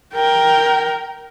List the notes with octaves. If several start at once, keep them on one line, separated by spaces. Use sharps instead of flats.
A#4 G5